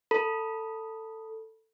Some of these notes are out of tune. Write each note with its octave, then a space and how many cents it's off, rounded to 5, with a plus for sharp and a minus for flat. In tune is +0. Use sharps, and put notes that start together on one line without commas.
A4 +15 B5 -25